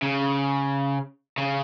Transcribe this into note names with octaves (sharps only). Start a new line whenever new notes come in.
C#3
C#3